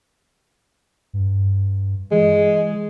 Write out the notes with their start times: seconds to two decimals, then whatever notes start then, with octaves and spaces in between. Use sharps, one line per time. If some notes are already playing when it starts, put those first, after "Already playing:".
1.13 G2
2.12 E3 G#3